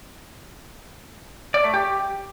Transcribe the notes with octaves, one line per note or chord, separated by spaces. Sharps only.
D5
A3
G4